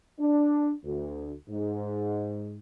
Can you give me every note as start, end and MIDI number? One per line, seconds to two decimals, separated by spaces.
0.19 0.71 62
0.84 1.32 38
1.49 2.59 44